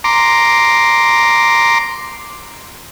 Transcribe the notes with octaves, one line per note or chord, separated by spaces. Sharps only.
A#5 C6 D6